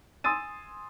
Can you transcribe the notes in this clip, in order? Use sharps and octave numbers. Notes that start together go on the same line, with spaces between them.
G#5 C6 D#6 E6 A6 D#7